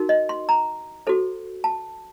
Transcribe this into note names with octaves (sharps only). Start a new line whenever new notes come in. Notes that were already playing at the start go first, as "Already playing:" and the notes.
Already playing: D#4 F#4 A#4
D#5
C6
A#5
F#4 A4 C5
A5